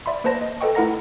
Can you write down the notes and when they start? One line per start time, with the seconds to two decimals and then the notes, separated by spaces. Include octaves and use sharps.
0.06 D5 E5 B5 C6
0.24 A#3 B4 C5 A5 A#6
0.41 D#5
0.61 A4 B4 D#5 G5 C#6
0.75 A3 E4 A#4 F#5 A#5 A#6